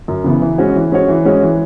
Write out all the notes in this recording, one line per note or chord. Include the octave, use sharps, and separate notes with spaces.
F#2
C#3 E3 B3
E3
G#3 C#4 F#4 C#5
E3
G#3 C#4 F#4 C#5
E3
G#3 C#4 F#4 C#5
E3